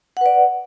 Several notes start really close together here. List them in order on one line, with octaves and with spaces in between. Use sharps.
F#5 B4 D5